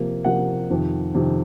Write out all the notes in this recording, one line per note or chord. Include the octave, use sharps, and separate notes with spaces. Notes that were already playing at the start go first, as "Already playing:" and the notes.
Already playing: C3 F3 A#3
C3 F3 A#3 F#5
F2 C3 D#3
F2 C3 D#3